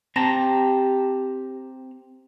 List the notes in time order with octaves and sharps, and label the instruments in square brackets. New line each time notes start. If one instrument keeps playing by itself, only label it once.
[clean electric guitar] C4 A5 A#5 [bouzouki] G4